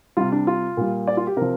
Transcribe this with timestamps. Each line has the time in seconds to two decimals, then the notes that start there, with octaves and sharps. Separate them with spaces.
0.17 C3 G3 F4
0.32 D4
0.47 F4
0.77 A#2 G3
1.07 D5
1.17 F4
1.27 G4
1.37 C3 F3 A#4